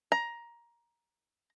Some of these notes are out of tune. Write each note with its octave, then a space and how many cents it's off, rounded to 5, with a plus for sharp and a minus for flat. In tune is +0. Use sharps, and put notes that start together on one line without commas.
A#5 +15